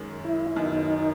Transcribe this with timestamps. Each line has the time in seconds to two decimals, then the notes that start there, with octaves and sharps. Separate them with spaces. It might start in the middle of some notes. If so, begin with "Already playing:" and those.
Already playing: F#2 D#3 G#3 C#4
0.25 E4
0.56 F#2 D#3 F#3 B3 D#4